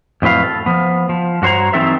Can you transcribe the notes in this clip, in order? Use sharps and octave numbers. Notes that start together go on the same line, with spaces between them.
F2 A2 F#3 B4 F5
A4
F3 B3
F3
G2 F#4 C5 C#5 A#5
E3 F#3 C4 D#4 A4 E5